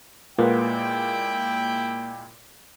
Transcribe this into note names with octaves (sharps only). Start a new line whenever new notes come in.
A#2 G#3 A#3 E4 F4 B4 F#5 G5